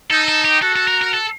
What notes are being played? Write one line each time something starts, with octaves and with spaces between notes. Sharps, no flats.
D#4 A4
A4
G4
F#4 A4
A4
A#4
A#4
A4